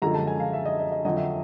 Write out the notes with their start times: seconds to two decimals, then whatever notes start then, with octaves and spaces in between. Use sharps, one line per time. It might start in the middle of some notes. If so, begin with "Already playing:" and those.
0.02 F#2 D3 F3 G#3 A#5
0.14 A5
0.27 G#5
0.40 F5
0.53 E5
0.65 D#5
0.80 D#5
0.92 D#5
1.05 F2 D3 F#3 D#5
1.17 E5